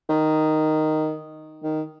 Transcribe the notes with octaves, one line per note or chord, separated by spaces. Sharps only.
D#3
D#3